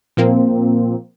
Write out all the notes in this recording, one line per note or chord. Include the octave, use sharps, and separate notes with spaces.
A#2 F3 A#3 C4